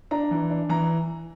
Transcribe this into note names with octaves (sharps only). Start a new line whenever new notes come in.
D4 A#5
E3
D4
E3 A#5